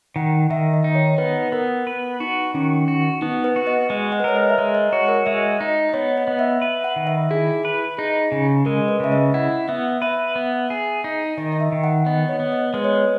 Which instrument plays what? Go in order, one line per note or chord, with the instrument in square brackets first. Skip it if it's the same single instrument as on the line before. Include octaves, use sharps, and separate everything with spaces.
[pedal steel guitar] D#3 [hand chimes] F#5
[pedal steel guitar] D#3 [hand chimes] E5
[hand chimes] D#5
[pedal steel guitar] D#4
[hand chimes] C#5
[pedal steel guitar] B3 [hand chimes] B4
[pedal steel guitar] B3 [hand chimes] A#4
[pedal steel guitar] B4
[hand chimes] D#4 [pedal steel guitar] F#4
[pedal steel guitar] D#3 [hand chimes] C#4
[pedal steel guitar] F#4
[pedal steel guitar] B3 [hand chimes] D#4
[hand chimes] B4
[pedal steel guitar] F#4
[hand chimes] D#5
[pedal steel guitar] G#3 [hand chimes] D#5
[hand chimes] F#5
B4
[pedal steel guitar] A#4 [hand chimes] C#5
[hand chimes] D#5
E5
[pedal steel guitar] G#3 [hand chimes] D#5
[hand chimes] D#5
[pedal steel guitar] F#4 [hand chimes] C#5
[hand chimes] A#4
[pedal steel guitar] G#3 [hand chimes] E5
[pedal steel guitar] D#4 [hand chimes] D#5
[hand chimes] D#5
[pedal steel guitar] B3 [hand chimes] C#5
[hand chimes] D#5
[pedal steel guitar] B3
[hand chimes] E5
[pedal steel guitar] B4 [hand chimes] E5
[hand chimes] F#5
[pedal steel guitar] D#3
[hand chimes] E5
[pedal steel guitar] E4 [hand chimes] G#4
[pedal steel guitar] B4
[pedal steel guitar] D#4 [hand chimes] G#4
[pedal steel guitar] C#3
[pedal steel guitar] G#3 [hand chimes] A#4
[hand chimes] B4
[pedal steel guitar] C#3 [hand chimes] E5
[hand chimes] D#5
[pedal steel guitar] E4 [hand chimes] F#5
[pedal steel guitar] B3 [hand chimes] E5
[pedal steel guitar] B4 [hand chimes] E5
[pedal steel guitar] B3
G#4
D#4
[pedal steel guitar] D#3 [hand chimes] D#5
[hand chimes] D#5
E5
[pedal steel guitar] D#3
[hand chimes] F#5
[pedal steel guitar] B3 [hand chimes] D#5
[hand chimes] C#5
[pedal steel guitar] B3
[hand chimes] D#5
[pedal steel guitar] G#3 [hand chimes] B4
[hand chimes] C#5
B4